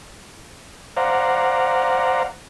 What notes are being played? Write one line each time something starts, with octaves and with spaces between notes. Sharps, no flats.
C5 D5 F5 F#5 A#5